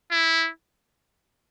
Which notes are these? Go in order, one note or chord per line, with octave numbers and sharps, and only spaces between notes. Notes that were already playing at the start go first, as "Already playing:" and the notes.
E4